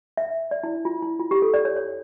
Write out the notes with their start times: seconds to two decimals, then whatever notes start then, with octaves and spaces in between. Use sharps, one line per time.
0.17 E5
0.51 D5
0.64 E4
0.85 F4
1.03 E4
1.19 F4
1.31 G4
1.42 A4
1.54 D5
1.65 C#5
1.76 C#5